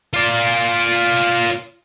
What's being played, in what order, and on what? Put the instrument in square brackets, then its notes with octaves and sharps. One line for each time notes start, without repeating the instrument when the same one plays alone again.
[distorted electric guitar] F4 D5